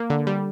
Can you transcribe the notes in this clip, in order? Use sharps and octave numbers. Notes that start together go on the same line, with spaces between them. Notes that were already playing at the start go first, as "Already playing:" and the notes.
Already playing: A#3
D3
G3